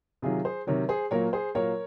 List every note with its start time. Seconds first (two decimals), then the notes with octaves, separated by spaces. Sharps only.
0.22 C3 D#3 F#3 F4 G#4
0.45 G#4 C5
0.67 C3 D#3 F#3 A#4 C#5
0.89 G#4 C5
1.11 A#2 F#3 A#3 A#4 C#5
1.33 G#4 C5
1.55 A#2 F#3 A#3 A#4 C#5